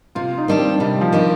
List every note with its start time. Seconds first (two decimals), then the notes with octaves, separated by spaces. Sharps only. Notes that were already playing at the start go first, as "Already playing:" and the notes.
0.15 C3 F4
0.38 D#4
0.48 D#3 G3 D4 G4
0.58 C4
0.80 C3 G3
1.01 F3
1.12 D#3 G3 D4 G4